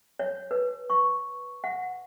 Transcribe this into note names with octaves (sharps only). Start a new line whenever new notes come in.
C#5
B4
C#6
F#5